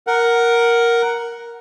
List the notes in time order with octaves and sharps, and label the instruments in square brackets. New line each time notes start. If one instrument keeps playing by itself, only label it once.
[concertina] A#4 F#5